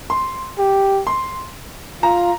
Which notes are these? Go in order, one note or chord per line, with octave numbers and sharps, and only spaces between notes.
C6
G4
C6
F4 A#5